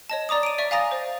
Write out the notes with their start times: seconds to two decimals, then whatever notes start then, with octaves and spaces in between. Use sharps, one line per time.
0.10 C#5 D#5 A5
0.29 D5 A#5 D6 D#6
0.43 D7 D#7
0.58 D5 E5 C#6
0.71 F5 G#5 A#5 D#6 A6 A#6
0.91 C5